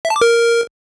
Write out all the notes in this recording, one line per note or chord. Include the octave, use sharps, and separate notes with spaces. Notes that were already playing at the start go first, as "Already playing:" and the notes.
E5
A5
D6
A#4